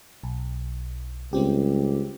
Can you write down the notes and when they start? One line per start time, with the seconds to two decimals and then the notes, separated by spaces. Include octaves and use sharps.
0.23 B1
1.33 C#2 G3 C4 G4